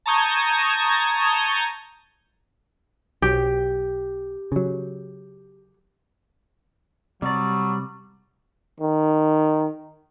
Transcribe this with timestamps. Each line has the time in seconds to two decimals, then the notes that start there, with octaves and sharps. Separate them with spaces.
0.06 A5 A#5 C#6 D#6 G6 G#6
3.22 B1 F#3 G4
4.52 C#3 F#3
7.22 C3 F#3 G3 D5
8.80 D#3